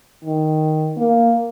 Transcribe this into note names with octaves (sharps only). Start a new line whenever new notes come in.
D#3
A#3